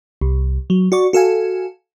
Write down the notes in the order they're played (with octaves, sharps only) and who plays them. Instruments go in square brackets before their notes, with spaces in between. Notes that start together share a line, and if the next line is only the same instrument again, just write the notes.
[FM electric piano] C2
F#3
F#4 D5 C#6
F#4 A4 F5 G#5